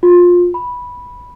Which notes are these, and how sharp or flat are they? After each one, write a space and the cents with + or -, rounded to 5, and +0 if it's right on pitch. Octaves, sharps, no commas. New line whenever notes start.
F4 +20
B5 -10